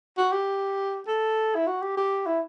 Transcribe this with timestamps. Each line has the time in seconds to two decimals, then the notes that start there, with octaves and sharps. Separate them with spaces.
0.18 F#4
0.32 G4
1.07 A4
1.55 E4
1.67 F#4
1.82 G4
1.97 G4
2.26 E4